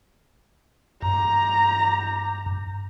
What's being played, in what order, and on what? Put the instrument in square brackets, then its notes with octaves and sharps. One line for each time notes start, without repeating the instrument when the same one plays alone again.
[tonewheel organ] G2 [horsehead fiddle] A#5